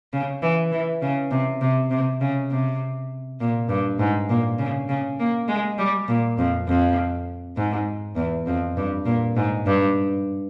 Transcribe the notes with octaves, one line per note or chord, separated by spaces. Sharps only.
C#3
E3
E3
C#3
C3
C3
C3
C#3
C3
A#2
G2
G#2
A#2
C#3
C#3
A#3
G#3
G3
A#2
F2
F2
G#2
E2
F2
G2
A#2
G#2
G2